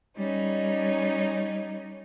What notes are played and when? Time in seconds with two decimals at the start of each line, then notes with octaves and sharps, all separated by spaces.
0.17 G3 C#4 D#4